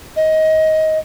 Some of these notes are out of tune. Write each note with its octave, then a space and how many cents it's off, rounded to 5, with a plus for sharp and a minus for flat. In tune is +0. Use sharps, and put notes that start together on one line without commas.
D#5 +20